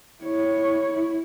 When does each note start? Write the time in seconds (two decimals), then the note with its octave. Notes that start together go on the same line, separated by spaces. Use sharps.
0.24 E4 C#5
0.92 E4